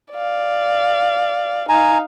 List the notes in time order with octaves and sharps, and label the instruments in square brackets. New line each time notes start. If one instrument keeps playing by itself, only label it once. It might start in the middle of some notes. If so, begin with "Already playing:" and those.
[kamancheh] D5 F5
[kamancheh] D#4 F5 [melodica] G#5 A#5